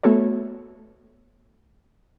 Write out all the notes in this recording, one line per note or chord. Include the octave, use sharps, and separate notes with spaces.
A3 B3 F#4 A4 C#5